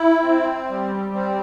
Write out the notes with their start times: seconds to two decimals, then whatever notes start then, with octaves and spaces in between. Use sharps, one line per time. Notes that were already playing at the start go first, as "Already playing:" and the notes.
Already playing: E4
0.22 C4
0.69 G3
1.14 C4